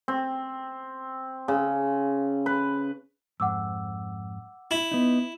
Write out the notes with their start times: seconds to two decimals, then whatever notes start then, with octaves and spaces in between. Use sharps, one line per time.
0.08 C4
1.48 C#3
2.46 B4
3.40 F2 G#2 F#5 D6 E6
4.71 E4
4.91 B3 D#4